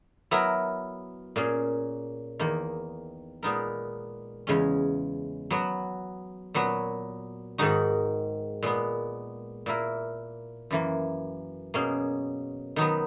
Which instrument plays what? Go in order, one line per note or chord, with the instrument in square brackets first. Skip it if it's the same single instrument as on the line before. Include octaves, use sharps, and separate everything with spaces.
[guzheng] F#3 B3 E4 A#4
A#2 A#3 C#4 G#4
E2 D#3 A#3
A#2 G#3 B3 D#4 A#4
E2 C#3 G#3 C#4
F#3 B3 F#4
A#2 F#3 B3 F#4
G#2 D#3 G#3 D#4 F#4
A#2 G#3 B3
A#2 A#3 E4 A#4
F#2 E3 A#3
B2 A#3 C#4 G#4
D#3 F#3 B3 D#4